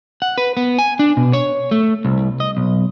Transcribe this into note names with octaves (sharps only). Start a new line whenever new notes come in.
F#5
B4
B3
G#5
D4
B2
C#5
A3
C2
D#5
B1